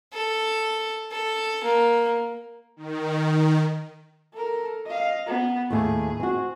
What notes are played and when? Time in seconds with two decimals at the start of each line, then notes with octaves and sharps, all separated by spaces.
0.14 A4
1.11 A4
1.64 A#3
2.76 D#3
4.33 A4 A#4
4.86 D#5 F5
5.26 B3
5.70 D#2 A2 E4 G#4
6.20 C4 F#4